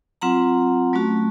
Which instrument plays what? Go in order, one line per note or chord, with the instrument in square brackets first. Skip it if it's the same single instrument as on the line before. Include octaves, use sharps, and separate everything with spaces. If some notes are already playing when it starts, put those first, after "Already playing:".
[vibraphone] F#3 C4 F4 F#5 A#5
F#3 A3 C#4 F#4